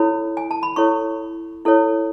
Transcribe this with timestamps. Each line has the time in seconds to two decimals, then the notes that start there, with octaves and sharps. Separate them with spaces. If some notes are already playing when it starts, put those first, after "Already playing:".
Already playing: E4 A4 C#5 B5
0.37 G#5
0.51 A5
0.63 B5
0.76 E4 A4 C#5 C#6
1.65 E4 A4 C#5